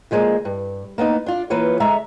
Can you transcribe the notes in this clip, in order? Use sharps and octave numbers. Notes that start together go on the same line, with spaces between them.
D3 F3 G#3 A#3
G2
A#3 B3 D4 D#4
D4 F4
E3 A#3 F4 B4 C#5
D3 G#3 E5 A#5